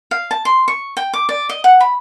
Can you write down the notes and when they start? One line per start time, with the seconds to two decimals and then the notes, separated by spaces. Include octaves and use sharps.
0.11 F5
0.31 A5
0.45 C6
0.68 C#6
0.97 G5
1.14 D6
1.29 D5
1.49 D#5
1.64 F#5
1.80 B5